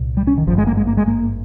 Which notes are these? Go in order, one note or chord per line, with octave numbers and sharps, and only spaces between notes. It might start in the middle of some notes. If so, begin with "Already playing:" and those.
Already playing: C2 A#2
G3
C#4
D#3
G#1 G2 F3
G#3
A#3
G#3
A#3
G#3
A#3